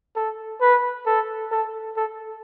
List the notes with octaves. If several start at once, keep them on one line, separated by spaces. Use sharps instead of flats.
A4
B4
A4
A4
A4